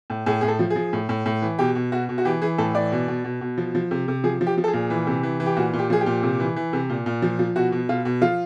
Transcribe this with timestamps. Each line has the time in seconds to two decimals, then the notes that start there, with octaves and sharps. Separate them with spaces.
0.10 A2
0.26 A2 G#4
0.41 A2 G#4
0.48 A4
0.59 F3
0.70 G#4
0.76 F3
0.93 A2
1.09 A2
1.26 A2
1.42 E3
1.59 B2 G4
1.75 B2
1.92 B2 F#4
2.09 B2
2.18 F#4
2.25 E3 G4
2.42 E3 G#4
2.58 A2 A4
2.75 E3 D5
2.92 B2
3.08 B2
3.24 B2
3.41 B2
3.58 F3
3.75 F3
3.91 C3
4.08 C3
4.24 F3 G#4
4.41 F3
4.47 G4
4.58 F3
4.64 A4
4.68 G#4
4.73 A#2
4.90 E3
5.07 C3
5.23 E3
5.40 E3
5.46 G4
5.57 A#2 F#4
5.73 A#2
5.79 G4
5.90 F3 G#4
6.01 G4
6.06 A#2
6.23 C3
6.40 E3
6.56 E3
6.73 C3
6.90 A#2
7.06 A#2
7.22 F3
7.39 F3
7.55 B2 F#4
7.72 B2
7.89 B2 F4
8.05 B2
8.22 F3 F4